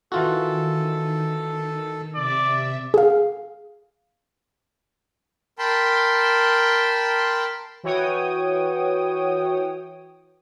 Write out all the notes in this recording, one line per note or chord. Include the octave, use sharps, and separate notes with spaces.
D#3 E3 F4 F#4 A4
C3 D5 E5
G#4 F5
A#4 G5 A5 B5 C6
E3 F#4 C#5 G5 D#6